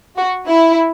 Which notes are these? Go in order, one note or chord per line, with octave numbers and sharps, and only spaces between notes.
F#4
E4